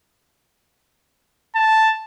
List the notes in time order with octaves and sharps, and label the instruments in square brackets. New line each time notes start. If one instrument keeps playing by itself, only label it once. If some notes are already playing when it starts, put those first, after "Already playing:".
[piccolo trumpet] A5